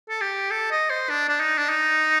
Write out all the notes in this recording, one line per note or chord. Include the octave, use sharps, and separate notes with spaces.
A4
G4
A4
D#5
C5
D4
D4
D#4
D4
D#4